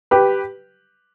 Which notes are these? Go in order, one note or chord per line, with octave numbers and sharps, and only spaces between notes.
G4 B4